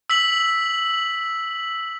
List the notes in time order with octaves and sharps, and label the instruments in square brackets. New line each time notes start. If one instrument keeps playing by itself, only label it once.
[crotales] E6 B6 F#7